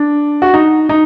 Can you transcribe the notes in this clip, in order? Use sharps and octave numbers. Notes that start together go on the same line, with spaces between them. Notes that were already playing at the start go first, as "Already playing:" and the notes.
Already playing: D4
F#4
D#4
D#4